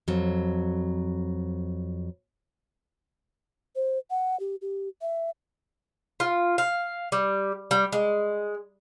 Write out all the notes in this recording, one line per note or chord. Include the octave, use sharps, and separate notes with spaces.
F2 F#3
C5
F#5
G4
G4
E5
F4
F5
G3
G3
G#3